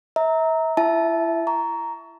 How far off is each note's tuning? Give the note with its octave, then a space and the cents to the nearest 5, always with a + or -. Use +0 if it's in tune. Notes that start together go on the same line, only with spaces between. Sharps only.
E5 -35 A#5 -5
E4 +30 E5 +0 A5 -15
A#5 +0 C#6 +30